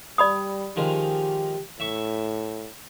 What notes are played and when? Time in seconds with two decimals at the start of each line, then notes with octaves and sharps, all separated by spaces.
0.18 G3 D5 B5 D#6
0.76 D#3 F3 G#3 G4
1.80 A2 E5 C#6